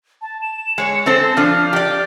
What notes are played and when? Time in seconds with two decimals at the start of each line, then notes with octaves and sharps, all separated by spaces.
0.22 A5
0.42 E7
0.78 G#3 C#5 C#7
1.06 C4 A4 C5 A6
1.37 F3 D4 F6
1.73 G4 D5